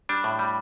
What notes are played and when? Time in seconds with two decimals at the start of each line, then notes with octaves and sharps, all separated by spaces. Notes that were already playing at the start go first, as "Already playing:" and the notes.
0.09 G3 D4
0.24 A2
0.39 G3